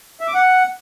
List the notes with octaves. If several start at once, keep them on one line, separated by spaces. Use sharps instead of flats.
E5
D6
F#5